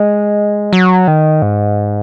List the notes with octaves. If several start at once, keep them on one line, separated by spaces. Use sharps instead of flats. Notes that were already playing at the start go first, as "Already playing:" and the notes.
Already playing: G#3
F#3
D#3
G#2